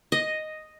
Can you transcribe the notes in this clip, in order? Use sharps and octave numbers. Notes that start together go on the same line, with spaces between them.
D#5